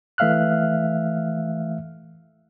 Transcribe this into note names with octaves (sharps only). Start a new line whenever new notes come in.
E3 A3 E5 F5 F6 F#6